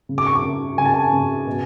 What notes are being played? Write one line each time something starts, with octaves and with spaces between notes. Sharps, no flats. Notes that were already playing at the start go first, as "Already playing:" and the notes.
C#3
D6
C#6
D6
C#3
C#3 G#5
A5
G#5
C#3
B2